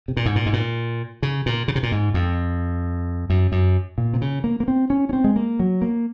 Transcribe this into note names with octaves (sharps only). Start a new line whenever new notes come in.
C3
A#2
G#2
A#2
G#2
A#2
C#3
A#2
C#3
C3
A#2
G#2
F2
F#2
F#2
A#2
C3
C#3
A#3
A#3
C4
C#4
C#4
C4
G#3
A#3
F#3
A#3